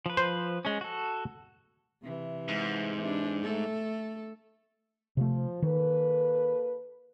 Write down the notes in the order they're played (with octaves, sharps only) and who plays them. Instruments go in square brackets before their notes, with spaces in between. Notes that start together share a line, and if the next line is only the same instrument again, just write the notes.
[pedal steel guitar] F3 B4
[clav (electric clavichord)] C5
[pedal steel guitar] G#3 C#4
F#4 A4
[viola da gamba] C3 E3
[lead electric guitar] G#2
[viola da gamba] E3 D4
A3 A4
[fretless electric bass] C3 A3 [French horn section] F3
[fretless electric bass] D#3 [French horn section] A#3 A4 B4